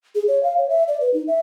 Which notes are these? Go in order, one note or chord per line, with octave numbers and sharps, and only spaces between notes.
G#4
C#5
F5
C#5
E5
D5
B4
D#4
E5